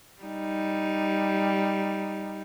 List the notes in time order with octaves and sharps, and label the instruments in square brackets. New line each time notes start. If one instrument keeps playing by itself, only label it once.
[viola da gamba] G3 D#4